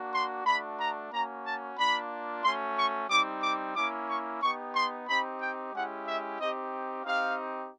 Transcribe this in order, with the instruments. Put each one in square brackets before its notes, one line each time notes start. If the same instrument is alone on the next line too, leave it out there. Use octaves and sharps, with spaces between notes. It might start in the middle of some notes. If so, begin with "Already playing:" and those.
Already playing: [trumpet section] A#3 D4 F#4
C6
A3 D4 F#4 B5
A#5
A#3 C#4 F#4 A#5
A5
A#3 D4 F4 B5
A3 C#4 F#4 C6
C#6
G3 C4 D#4 D6
D6
A#3 C#4 E4 D6
C#6
B3 D#4 G4 C#6
C6
C4 D#4 G4 B5
G5
G#3 C#4 E4 G4 F#5
E5
C4 D#4 G4 D#5
C4 D#4 G4 F5